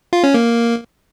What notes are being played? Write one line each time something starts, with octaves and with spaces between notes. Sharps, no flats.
F4
C#4
A#3